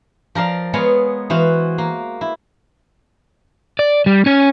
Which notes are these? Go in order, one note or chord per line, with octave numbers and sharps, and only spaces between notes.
F3 A#4 D5 F5
G#3 B3 G#4 C#5 F5
E3 F#4 C5 F5
A#3
E4
D5
G3
C#4 C#5